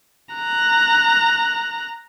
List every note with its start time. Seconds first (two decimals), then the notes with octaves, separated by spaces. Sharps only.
0.35 A#5 F#6